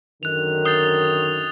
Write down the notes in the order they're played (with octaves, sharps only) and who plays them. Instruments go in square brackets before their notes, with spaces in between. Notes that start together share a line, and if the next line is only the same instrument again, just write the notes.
[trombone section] F#2 D3 D#3 [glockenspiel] F#6 F7
[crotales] D#6 A6 F7 [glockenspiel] G6 C7 G7